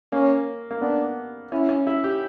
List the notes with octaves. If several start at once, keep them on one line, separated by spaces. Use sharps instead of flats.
A#3 C#4
A#3
B3 D4
C#4 E4
C#4
E4
G4